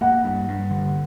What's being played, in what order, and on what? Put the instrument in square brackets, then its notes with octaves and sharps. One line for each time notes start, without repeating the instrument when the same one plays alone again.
[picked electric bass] A#3 [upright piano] F#5
[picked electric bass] G2
G2
D3